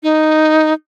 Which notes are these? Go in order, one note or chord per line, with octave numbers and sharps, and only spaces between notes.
D#4